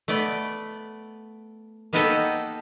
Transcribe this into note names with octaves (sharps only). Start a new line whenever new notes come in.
A3 B3 D5
A#3 B3 D#4 F#4 G4 A4